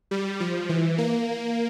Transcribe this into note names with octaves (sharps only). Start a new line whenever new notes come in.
G3
F3
E3
A#3